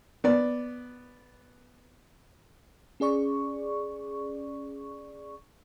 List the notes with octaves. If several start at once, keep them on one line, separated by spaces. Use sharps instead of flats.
B3 D5
C#4 G#4 D5 C#6